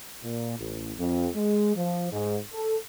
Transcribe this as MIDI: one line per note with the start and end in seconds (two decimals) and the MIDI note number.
0.24 0.57 46
0.59 0.92 33
0.98 1.28 41
1.35 1.74 56
1.75 2.09 53
2.11 2.37 44
2.53 2.76 69